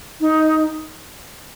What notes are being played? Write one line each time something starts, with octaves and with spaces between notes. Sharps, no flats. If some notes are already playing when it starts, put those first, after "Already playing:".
D#4